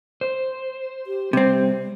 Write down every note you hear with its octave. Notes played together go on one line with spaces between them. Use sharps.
C5
G4
C3 G3 C4